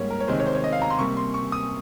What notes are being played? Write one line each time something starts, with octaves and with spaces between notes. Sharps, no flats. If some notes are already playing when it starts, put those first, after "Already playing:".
Already playing: G#2 G3 A#3 C#5
A#4
C#5
C3 D#3 G#3 C5
C#5
C5
C#5
D#5
F5
A#5
C6
C3 G3 A#3 C#6
C6
C#6
D#6